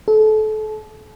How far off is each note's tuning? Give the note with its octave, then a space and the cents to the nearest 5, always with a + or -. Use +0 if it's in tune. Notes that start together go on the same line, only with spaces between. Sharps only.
A4 -30